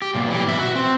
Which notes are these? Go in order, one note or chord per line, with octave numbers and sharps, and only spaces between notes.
G4
B1 A#2
E3 G4
B2 E5
F#4
C4